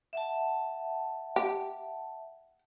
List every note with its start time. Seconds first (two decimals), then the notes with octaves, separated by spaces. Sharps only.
0.13 E5 F#5 A5
1.36 G4